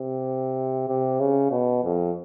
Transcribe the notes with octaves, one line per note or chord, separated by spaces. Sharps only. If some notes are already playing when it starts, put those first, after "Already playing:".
Already playing: C3
C3
C#3
B2
F2